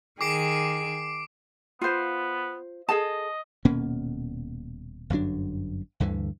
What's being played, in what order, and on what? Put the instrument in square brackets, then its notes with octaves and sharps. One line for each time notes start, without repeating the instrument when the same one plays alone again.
[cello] D#3 G#4 [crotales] D6 C7 D7
[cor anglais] B3 [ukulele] F4 C5
[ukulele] G#4 A4 A5 [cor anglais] D#5
[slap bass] D#1 B2 A#3 C#4
G1 F#2 F#3 D4
D2 G2 D3 E3